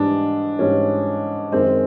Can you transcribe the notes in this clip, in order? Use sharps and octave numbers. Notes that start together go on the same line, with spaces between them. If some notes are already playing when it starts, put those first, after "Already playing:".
Already playing: G#2 E3 G3 D4
G#2 E3 G3 C#4
F#2 D#3 G#3 C4